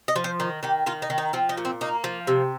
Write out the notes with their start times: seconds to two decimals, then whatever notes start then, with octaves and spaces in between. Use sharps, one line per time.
0.08 D#5
0.16 F3
0.24 C5
0.40 D#3
0.63 D#3 G4
0.86 D#3 F4
1.02 D#4
1.10 D#3
1.18 D#4
1.33 F3 C4
1.49 D#4
1.57 A#2
1.65 C4
1.81 A#3 D#4
2.04 F3
2.27 C3